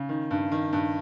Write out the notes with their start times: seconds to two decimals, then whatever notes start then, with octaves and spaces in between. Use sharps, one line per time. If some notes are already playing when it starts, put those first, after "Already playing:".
Already playing: C#3
0.09 D#3
0.31 G2
0.52 D#3
0.73 G2